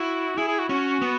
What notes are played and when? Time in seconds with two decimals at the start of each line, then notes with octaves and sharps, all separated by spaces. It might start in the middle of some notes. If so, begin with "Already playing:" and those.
Already playing: E4 F#4
0.38 E4 G#4
0.48 G#4
0.59 F#4
0.69 C#4 F#4
1.02 B3